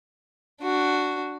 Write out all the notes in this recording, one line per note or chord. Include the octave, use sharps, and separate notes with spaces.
D4 F#4